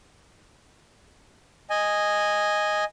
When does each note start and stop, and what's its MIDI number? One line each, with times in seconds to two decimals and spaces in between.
1.70 2.84 75
1.70 2.84 80